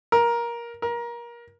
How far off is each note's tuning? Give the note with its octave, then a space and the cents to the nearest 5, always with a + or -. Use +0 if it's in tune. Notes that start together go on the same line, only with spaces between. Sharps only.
A#4 +15
A#4 +25